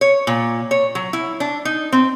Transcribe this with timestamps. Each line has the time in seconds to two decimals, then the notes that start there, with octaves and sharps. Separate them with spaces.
0.01 C#5
0.27 A#2
0.71 C#5
0.95 F#3
1.13 E4
1.40 D4
1.65 D#4
1.92 C4